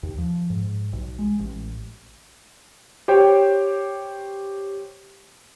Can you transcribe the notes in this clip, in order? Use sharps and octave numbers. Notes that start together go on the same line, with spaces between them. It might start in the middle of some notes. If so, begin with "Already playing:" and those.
D#2
F3
G#2
B1
G#3
A1
G4 C5 C#5 G5